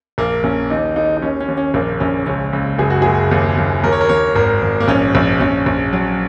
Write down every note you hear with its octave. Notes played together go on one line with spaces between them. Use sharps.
A#1 A#3
A#1 C#4
D#2 D#4
D#2 D#4
D#4
D#2 C#4
C#4
D#2
C#4
A#1 A#3
A#1 C#4
C#2 C#4
C#2
F#1 G#4
F#4
F#1 G#4
D#2
D#2
D#2 A#4
C#5
A#4
D#2 C#5
G#1 A#4
G#1
A#3
A#1 C#4
A#1
A#1 C#4
A#1
F#3